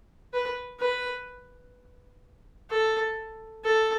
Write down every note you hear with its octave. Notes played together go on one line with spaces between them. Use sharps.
B4
B4
A4
A4